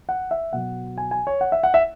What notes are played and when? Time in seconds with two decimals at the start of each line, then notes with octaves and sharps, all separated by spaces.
0.09 F#5
0.31 E5
0.53 B2 F#3 B3 F#5
0.98 G#5
1.11 G#5
1.27 C#5
1.41 F#5
1.52 E5
1.63 F#5
1.74 E5